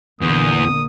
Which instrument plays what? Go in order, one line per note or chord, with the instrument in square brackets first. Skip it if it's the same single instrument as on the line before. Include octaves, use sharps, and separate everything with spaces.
[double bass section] A#1 D3 A#3 [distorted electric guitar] E2 [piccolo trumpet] D#6